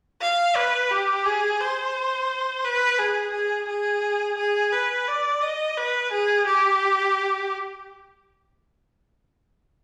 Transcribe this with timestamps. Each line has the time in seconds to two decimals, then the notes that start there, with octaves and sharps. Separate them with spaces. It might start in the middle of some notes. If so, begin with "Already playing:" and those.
0.22 F5
0.56 B4
0.91 G4
1.26 G#4
1.60 C5
2.64 B4
2.99 G#4
3.34 G#4
3.69 G#4
4.38 G#4
4.73 B4
5.08 D5
5.42 D#5
5.77 B4
6.12 G#4
6.47 G4